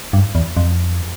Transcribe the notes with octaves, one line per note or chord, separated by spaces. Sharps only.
G2
E2
F2